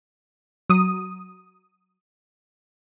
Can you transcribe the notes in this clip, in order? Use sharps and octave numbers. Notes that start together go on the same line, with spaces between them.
F#3 D#6